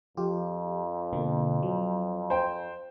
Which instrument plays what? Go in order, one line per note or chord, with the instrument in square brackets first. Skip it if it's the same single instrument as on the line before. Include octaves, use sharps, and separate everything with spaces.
[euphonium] F2 [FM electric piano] F3 F4 G4
[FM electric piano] B2 D3 A#3
F#3
[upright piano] C5 G5